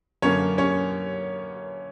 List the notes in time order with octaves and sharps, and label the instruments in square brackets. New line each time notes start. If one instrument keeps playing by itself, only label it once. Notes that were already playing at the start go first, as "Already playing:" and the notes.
[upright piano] F#2 D3 A#3 C#4 C#5
C#4 C#5